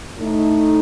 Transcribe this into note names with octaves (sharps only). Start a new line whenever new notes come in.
A2 A3 D#4